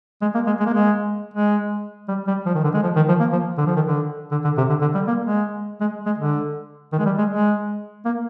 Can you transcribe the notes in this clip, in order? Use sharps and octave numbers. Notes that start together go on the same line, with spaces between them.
G#3
A#3
G#3
G#3
A#3
G#3
G#3
G3
G3
F3
D#3
D3
G#3
F3
D#3
F3
A#3
F3
D3
F3
D#3
D3
D3
D3
C3
D3
D3
G3
A#3
G#3
G#3
G#3
D3
D#3
G#3
G3
G#3
G#3
A#3